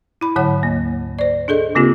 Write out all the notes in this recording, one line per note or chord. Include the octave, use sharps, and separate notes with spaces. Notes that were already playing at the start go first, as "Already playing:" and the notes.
E4 B5
G#2 D3 F#3 C#5 F#5
D2 A#3
C5 D5
D4 G#4 A4 D#5
C#3 A#3 C4 F4 G4